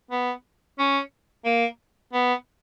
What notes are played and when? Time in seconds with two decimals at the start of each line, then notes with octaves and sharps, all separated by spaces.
0.11 B3
0.78 C#4
1.45 A#3
2.13 B3